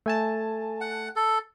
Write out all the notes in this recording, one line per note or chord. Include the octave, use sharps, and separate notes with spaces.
A3 G#5 A5
F#5
A4